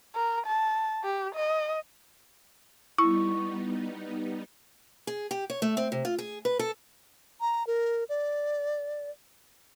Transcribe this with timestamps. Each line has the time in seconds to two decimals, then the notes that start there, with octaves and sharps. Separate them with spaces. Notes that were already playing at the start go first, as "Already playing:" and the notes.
0.15 A#4
0.47 A5
1.04 G4
1.35 D#5
2.98 G3 B3 D#4 E4 C#6
5.07 G#4
5.31 G4
5.50 C#5
5.62 A3
5.77 C4
5.92 C3
6.05 F4
6.18 G#4
6.45 B4
6.59 A4
7.41 A#5
7.67 A#4
8.09 D5